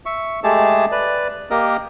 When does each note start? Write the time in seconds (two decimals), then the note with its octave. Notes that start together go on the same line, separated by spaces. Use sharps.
0.06 E5 C#6
0.44 G#3 A3 G4 G#4 A5
0.92 B4 D5
1.50 A#3 G4 A#4 D#5